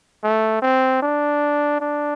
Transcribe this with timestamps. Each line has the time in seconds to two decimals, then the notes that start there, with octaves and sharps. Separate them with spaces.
0.23 A3
0.62 C4
1.02 D4
1.80 D4